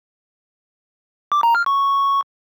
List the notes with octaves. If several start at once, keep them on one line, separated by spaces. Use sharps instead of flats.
D6
A#5
F6
C#6